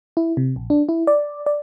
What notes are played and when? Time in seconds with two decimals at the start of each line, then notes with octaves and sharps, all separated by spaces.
0.17 E4
0.37 C3
0.56 A#1
0.70 D4
0.89 E4
1.07 D5
1.46 D5